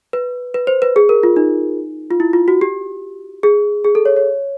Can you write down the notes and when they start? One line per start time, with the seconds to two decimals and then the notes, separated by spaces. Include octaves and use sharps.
0.13 B4
0.54 B4
0.67 C5
0.82 B4
0.96 G#4
1.09 A#4
1.23 F4
1.36 D#4
2.11 F4
2.20 E4
2.33 F4
2.48 F#4
2.61 G4
3.43 G#4
3.84 G#4
3.95 A4
4.05 C#5
4.16 C#5